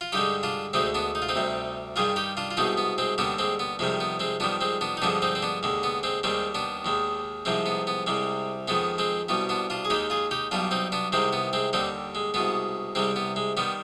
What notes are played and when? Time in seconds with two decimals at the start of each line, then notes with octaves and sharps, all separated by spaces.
0.01 F4
0.12 G2 D3 G#3 D#4 G4
0.43 D4 F4
0.73 D2 D3 G#3 C4 D#4
0.94 B3 D4
1.15 D#4
1.22 F4
1.29 C4 D#4
1.35 D2 C3 G3
1.96 G2 D#3 G3 F4 G#4
2.16 D#4 G4
2.37 D4 F4
2.51 F4
2.57 C2 B2 G#3 C4 D#4
2.77 B3
2.98 G#3 C4
3.18 D#2 D3 G3 B3 D4
3.39 G#3 C4
3.59 B3
3.79 F2 C3 D#3 G3 G#3
4.00 B3
4.20 G#3 C4
4.40 F2 D#3 G3 B3 D4
4.61 G#3 C4
4.81 B3 D4
4.97 D#4
5.02 G2 D3 F3 G#3 B3 D4
5.22 C4 D#4
5.35 C4
5.42 B3 D4
5.63 D#2 D3 G#3
5.83 B3
6.03 G#3 C4
6.23 D#2 D#3 G3 G#3 C4
6.55 B3 D4
6.85 D#2 D#3 G#3
7.45 C2 C3 F3 G#3 C4
7.66 B3
7.87 B3
8.07 C2 C3 G3 G#3
8.68 F2 D#3 G#3 B3
8.98 G#3 C4
9.29 C2 B2 G3 B3
9.49 B3 D4
9.70 D4 F4
9.85 G#4
9.90 D#2 D#3 G#3 D#4 G4
10.10 F4 G#4
10.31 D#4 G4
10.51 B1 B2 G3 D4 F4
10.71 C4 D#4
10.92 B3 D4
11.12 C2 C3 D#3 G#3 C4
11.33 B3
11.53 G#3 C4
11.73 D#2 D3 G3 C4 D#4
12.15 G#3
12.34 C2 B2 G#3 B3
12.95 C2 C3 G3 G#3 C4
13.16 B3
13.36 G#3
13.57 D#3 G3 B3